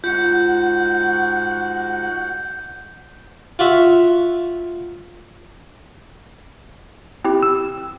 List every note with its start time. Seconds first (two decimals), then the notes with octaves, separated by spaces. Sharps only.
0.04 G#2 G#3 F4 F#4 F#5 G6 C#7
3.59 F4 F#4 E5
7.25 C4 E4 G4
7.43 E6